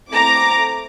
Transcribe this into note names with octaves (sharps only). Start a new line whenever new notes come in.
A3 C4 E4 A#5 D6